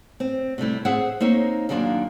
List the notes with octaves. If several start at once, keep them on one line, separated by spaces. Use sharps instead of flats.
C4
C3 G3 A3 E4
C4 G#4 C5 E5 F#5
A#3 C4 D#4 A#4 C#5 E5
F#2 D#3 A#3 D4 F4